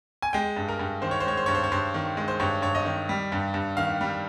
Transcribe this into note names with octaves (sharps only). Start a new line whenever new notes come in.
G#5
G#3 G5
G2
A#4
G2
D#3 C5
C#5
C5
G#3 C#5
C5
G2 C#5
C5
C#5
G2 C5
D#3
G#3
C5
G2 C#5
G2 C#5
D#5
D#3
G3
G2
G2
D#3 F5
G3